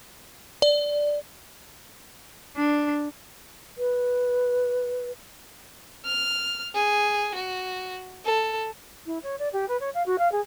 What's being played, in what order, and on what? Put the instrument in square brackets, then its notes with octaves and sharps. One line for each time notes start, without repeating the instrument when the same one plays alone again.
[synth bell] D5
[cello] D4
[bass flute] B4
[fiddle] F6
G#4
F#4
A4
[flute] E4
C#5
D5
G4
B4
C#5
F5
F#4
F5
G#4